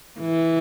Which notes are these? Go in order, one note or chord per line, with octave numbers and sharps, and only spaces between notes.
E3